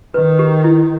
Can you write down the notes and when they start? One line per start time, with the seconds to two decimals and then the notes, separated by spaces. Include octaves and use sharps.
0.14 D#3 B4
0.39 G4
0.64 E4